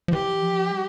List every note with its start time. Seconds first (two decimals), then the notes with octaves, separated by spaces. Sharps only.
0.08 F3
0.13 E3 G4
0.42 F3
0.72 G3